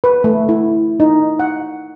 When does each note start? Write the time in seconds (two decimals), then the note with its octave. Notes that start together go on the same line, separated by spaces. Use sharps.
0.04 B4
0.24 A3
0.49 E4
1.00 D#4
1.39 F#5